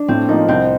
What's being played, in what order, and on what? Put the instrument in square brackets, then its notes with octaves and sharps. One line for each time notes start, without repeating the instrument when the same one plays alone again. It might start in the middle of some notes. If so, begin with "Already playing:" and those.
Already playing: [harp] D4
[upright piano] A2 [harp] C4
[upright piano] F3 A#3 [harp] D#4
[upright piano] C2 [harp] C4